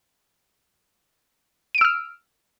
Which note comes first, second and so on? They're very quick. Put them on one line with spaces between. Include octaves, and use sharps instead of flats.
D#7 D7 E6 F6